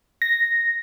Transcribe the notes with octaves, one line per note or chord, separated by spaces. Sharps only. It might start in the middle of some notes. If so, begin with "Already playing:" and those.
A#6